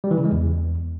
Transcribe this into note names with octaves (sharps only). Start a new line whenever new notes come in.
G3
E3
C#3
G#3
E2